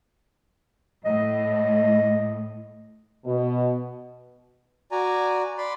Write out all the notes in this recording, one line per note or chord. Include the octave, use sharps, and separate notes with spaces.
A2 D#5
B2
F#4 D5 G#5 A#5
D5 B5 C6